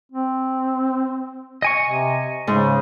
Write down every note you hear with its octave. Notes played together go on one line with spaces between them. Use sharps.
C4
D#5 G#5 C#6
C3
G#2 C#3